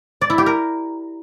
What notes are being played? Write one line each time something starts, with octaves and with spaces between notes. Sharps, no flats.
D5
E4
G4
A#4